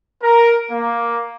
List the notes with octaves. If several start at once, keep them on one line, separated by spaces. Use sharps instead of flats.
A#4
A#3